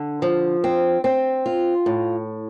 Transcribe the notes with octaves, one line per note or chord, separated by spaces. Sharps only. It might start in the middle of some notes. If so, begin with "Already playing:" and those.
Already playing: D3
F3
C4
C4
F4
A2